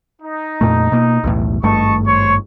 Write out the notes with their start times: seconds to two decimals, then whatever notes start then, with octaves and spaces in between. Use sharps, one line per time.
0.21 D#4
0.61 F2 A#2 A3
0.92 B2 A#3
1.24 B1 E2 A2
1.63 G#1 G2 A3 D#5 A5 C#6
2.05 C5 C#5 C#6